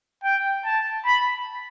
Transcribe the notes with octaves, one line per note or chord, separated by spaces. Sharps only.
G5
A5
B5